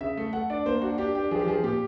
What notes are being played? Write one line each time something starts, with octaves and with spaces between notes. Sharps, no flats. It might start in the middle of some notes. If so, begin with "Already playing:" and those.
C#3 E5
A3
A3 F#5
D4 D5
A#3 C5
D4 F#4
D4 G4
D4 G4
F3 G#4
G4
F3 G#4
A#2 G4